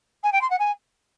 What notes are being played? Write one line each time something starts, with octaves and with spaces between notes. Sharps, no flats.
G#5
G5
C6
F#5
G#5